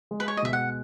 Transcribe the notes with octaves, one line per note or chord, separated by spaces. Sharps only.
G#3
B4
C#5
D#5
B2 E5
F#5